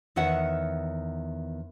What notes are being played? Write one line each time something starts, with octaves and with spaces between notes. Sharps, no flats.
E2 D#3 C#5 E5 F#5